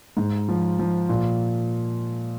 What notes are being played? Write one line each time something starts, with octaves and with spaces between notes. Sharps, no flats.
G#2
F3
F3
A#2